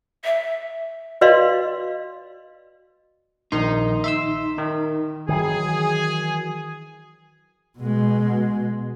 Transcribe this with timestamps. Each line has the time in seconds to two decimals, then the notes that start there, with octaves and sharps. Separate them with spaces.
0.25 E5
1.21 F#4 B4 D5 D#5 F5 C6
3.52 A#1 D#3 D#4 C6
4.04 E5 C6 E6
4.58 D#3
5.29 D#3 E3 F#3 G#4
7.78 B2 G#3